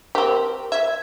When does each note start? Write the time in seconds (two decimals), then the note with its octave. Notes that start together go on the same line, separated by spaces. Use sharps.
0.15 C4 G4 A#4
0.72 E5 G#6